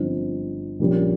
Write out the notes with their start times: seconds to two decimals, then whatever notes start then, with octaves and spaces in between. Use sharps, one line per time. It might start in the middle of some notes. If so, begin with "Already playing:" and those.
Already playing: G1 G2 F3 C4 D#4
0.79 A#1 A#2 G3 C#4